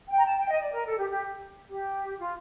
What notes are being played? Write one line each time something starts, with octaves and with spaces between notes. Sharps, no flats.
G5
A#5
A5
G5
D#5
D5
A#4
A4
G4
G4
G4
F4